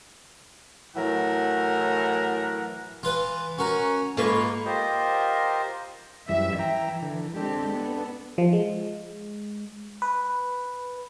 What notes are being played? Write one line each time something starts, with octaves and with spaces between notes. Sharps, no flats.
A2 E3 F#3 A#4 F#5
E3 F4 B4
C#4 F#4 A#4
G#2 A#3 F4 A4 B4 C#6
F4 G4 A#4 C5 D#5
F#2 E3 G3 E5
E3 E5 G5 A#5
D3
G#3 C4 D4 G4 A4
B3
F3
G#3
B4